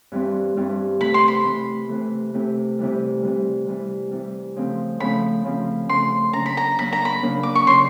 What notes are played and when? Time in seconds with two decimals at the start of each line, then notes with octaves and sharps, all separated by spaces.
0.12 G2 E3 G3 C4
0.56 G2 E3 G3 C4
1.00 C3 E3 A3 B5
1.14 C6
1.28 B5
1.45 C3 E3 A3
1.89 C3 E3 A3
2.34 C3 E3 A3
2.79 C3 E3 G3
3.23 C3 E3 G3
3.67 C3 E3 G3
4.11 C3 E3 G3
4.56 C#3 F3 A3 C4
5.00 C#3 F3 A3 C4 B5
5.45 C#3 F3 A3 C4
5.89 C#3 F3 A3 C4 C6
6.33 C#3 F#3 A#3 D4 A#5
6.46 B5
6.57 A#5
6.78 C#3 F#3 A#3 D4 B5
6.93 A#5
7.05 B5
7.22 C#3 F#3 A#3 D4
7.43 D6
7.55 C#6
7.67 C#3 F#3 A#3 D4 C6